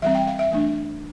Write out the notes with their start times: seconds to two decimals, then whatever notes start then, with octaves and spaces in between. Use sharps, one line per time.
0.02 E3 G3 C4 E5
0.15 G5
0.27 F5
0.39 E5
0.51 E3 A3 D4